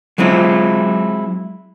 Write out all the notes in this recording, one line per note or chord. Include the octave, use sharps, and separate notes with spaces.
F#3 G#3 C4 E4 F4